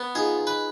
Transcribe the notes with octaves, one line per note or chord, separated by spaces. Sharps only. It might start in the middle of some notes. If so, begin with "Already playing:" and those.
Already playing: B3
D#4 F4 G#4
B4